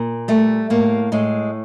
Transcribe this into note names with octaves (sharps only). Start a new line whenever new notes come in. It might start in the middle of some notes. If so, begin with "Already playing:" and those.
Already playing: A#2
G3 A3
A2 A#3
A2 G#3